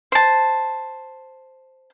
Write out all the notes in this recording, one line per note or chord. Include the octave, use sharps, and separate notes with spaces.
C5 A5